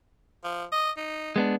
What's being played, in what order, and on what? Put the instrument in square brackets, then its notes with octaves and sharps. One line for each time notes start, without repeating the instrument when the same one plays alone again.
[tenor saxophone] F3
D#5
D#4
[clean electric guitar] G#3 B3 D4